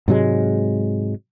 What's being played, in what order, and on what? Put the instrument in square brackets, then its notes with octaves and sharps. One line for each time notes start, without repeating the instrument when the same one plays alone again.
[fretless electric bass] G#2 C3 F#3 G#3